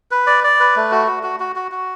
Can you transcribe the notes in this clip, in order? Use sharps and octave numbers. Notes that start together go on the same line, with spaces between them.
B4
D5
D5
B4
A3
F#4
F#4
F#4
F#4
F#4
F#4